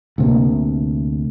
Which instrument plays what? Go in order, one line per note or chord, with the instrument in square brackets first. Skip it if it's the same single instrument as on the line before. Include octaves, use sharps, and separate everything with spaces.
[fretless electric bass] D2 C3 A#3